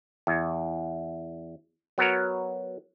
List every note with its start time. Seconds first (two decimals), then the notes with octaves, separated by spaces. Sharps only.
0.27 E2
1.98 F#3 B3 F#4 A#4 C#5